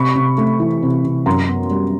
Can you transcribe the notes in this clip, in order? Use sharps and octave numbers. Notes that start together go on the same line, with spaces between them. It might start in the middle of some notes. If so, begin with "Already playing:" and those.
Already playing: C3 B5 C#6
C3
A3
E3
C3
C3
F#2 A#5 C6
B3
G3